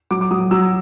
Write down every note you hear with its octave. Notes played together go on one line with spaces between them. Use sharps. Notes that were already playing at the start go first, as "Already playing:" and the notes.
F#3 D6
D6
F#3 D#6
F#3 E6